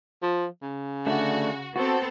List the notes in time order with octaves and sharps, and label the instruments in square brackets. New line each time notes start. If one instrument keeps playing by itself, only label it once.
[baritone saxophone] F3
C#3
[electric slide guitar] D3 A3 D4 [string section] F#4
[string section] B3 C4 A4 [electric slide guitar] F#4